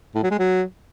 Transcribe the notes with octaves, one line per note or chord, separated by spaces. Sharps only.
A2
F#3
G#3
F#3